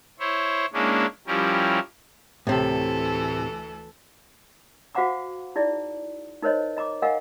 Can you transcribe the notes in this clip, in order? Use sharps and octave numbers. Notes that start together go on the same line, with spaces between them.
E4 C5 C#5
G#3 A#3 C#4 D4 E4
F3 G3 C#4 E4 G4 A#4
D2 A2 C3 E3 A4
F#4 C5 F5 F#5 A#5 D6
D#4 E4 G#4 D5
D#4 A#4 C5 C#5 D#5
D#5 A#5 D6
A#4 D#5 F5 F#5 G#5 A#5